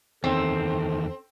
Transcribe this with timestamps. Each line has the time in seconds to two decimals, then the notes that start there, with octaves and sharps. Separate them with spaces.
0.24 E2 D#3 C4 A4